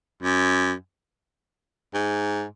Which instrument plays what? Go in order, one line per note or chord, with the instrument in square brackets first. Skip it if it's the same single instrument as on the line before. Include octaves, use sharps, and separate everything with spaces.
[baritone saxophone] F#2
G#2